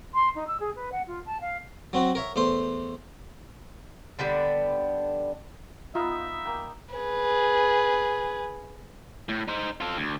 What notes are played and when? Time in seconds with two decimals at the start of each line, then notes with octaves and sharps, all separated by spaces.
0.14 C6
0.35 D#4
0.47 E6
0.60 G#4
0.76 B4
0.92 F#5
1.07 F4
1.26 A5
1.41 F5
1.93 F#3 C4 F#4
2.15 A#4 C#5 E5
2.36 E2 A3 C5 C6
4.19 D3 G3 B3 D4
5.95 B3 D#4 F4 E5
6.45 A#3 G5
6.95 G#4 B4
9.29 A2
9.48 D#4 C5
9.80 F4 A4
9.97 D2